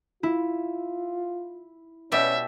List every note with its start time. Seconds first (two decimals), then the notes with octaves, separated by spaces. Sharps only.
0.23 E4 F4
2.12 B2 G3 C#4 E5